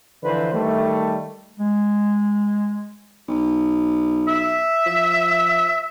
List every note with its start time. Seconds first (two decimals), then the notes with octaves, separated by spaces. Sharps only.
0.23 D3 E3 F3 B4 C5
0.52 D#3 G3 A3
1.60 G#3
3.28 B1
4.28 E5
4.86 F3